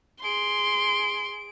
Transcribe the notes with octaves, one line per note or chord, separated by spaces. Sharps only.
G#4 C6 D7